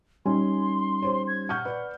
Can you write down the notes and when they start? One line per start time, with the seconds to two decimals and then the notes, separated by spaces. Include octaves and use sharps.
0.26 G3 C#4 D#4 G#5 C6
1.02 G4 C5 C#5
1.28 G#6
1.49 F#5 C#6 F6 G6
1.65 B4 D5